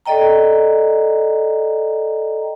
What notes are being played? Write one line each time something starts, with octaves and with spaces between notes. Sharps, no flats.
A4 D5 D#5 G5 A#5